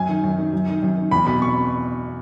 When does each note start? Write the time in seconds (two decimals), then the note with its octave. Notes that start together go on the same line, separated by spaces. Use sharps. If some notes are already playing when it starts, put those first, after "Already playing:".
Already playing: F#2 G#5
0.09 D#3
0.24 F#2
0.38 D#3
0.53 F#2
0.68 D#3
0.83 F#2
0.97 D#3
1.11 E2 B5
1.26 B2 B5
1.42 C#6